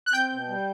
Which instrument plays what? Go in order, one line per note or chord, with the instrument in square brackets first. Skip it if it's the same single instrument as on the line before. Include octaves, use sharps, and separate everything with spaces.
[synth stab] F#6
[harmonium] C4 [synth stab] G5 G6
[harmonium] B2
G3